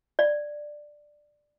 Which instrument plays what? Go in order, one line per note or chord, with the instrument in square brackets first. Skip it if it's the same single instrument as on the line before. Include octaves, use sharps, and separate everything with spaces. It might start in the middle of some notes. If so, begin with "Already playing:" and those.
[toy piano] D5